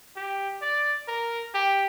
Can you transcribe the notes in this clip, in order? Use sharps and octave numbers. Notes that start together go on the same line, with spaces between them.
G4
D5
A#4
G4